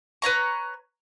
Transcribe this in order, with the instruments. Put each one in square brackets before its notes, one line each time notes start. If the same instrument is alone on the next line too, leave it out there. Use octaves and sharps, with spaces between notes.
[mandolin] B4 C#5 A#5 C#6